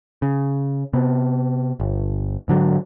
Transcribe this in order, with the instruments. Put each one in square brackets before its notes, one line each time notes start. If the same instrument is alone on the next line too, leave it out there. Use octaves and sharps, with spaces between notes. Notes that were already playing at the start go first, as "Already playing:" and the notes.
[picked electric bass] C#3
C3 B3
G1
G#2 D3 F#3